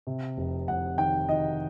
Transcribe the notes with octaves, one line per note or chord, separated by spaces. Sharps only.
C3
F1
F1 F#5
D#3 G5
D#3 D#5